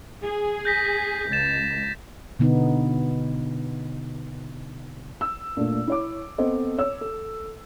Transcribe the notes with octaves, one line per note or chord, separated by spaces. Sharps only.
G#4
G6 A#6 B6
C#2 A6 E7
B2 D3 B3 D#4
E6
A#2 A3 D4
E4 C#5 D6
B3 C4 A4 C5 D#5
C#5 E6
A4